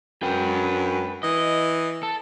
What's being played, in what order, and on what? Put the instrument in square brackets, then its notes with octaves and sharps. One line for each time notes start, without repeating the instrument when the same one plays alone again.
[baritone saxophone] F#2 [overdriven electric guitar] B4 G5
[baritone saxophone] E3 [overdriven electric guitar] D#5
[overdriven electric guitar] A4